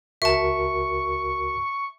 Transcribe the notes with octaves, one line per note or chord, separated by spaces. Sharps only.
C#2 F#4 A#4 E5 A5 C#6